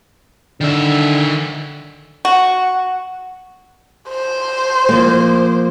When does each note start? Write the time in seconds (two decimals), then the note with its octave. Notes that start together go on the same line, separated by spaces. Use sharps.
0.61 D3 D#3 E5
2.25 F#4
4.09 C5
4.89 F3 A#3